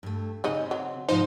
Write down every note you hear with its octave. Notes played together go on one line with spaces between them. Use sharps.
G2 A3
C#3 G#3 C4 D#4 D#5
F#3
G#2 C3 F3 D#4 F4 C5